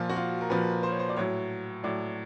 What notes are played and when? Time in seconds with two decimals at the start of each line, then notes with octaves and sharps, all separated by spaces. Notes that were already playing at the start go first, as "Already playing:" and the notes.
Already playing: A#2 F3 F4
0.09 F#4
0.16 F4
0.41 A#4
0.50 A#2 F3 B4
0.83 C5
0.91 C#5
0.99 C5
1.09 D5
1.16 A2 F#3 C#5
1.84 A2 F#3 D5